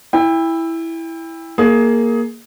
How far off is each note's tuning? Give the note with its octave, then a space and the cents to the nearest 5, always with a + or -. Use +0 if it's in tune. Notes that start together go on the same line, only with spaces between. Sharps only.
E4 +0 G5 +35
A#3 +0 G#4 +15